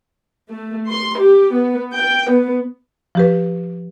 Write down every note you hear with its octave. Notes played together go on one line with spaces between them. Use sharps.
A3
C6
G4
B3
G5
B3
F3 G4 B4